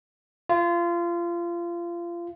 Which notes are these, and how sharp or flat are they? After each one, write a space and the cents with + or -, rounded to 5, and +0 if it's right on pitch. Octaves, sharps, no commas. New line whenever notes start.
F4 -25